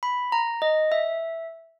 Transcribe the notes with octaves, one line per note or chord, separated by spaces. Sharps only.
B5
A#5
D#5
E5